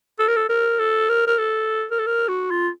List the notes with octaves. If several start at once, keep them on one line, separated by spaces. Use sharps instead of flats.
A4
A#4
A4
A#4
A4
A#4
A#4
A4
A#4
A4
A#4
F#4
F4